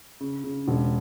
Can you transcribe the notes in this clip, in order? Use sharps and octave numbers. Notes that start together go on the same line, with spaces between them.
C#3
C#3
E1